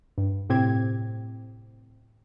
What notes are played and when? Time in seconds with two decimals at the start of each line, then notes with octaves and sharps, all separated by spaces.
0.18 G2
0.49 A2 C3 C4 G4 G#6